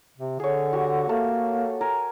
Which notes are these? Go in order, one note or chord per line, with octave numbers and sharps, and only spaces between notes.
C3
D3 G#4 C#5
F#4 G4 C#6
A3 A#3 A4 A#5
A#4 G#5 A5